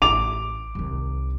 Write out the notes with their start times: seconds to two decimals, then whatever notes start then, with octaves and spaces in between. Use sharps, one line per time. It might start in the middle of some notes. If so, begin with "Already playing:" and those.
0.02 A1 D6 F7
0.75 C2 D#3